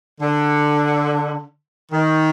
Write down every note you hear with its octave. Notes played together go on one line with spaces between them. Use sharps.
D3
D#3